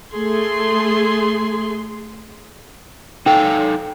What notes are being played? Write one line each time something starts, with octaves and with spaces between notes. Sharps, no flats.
A3 G#4 C6
D#4 A4 F5 G5